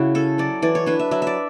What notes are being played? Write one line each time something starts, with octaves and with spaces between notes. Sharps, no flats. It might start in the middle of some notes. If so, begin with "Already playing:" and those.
Already playing: C#3 E4 F#4
C#4 A4
F#3 D5
E3 D5
C#5
D4 B4
E5
F#3 E5
D5 E5